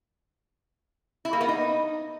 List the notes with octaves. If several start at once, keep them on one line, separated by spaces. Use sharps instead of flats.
E4
A#3
B3
D#4